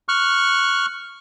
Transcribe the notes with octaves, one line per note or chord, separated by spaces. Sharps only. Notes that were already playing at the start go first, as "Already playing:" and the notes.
C#6 F6 F#6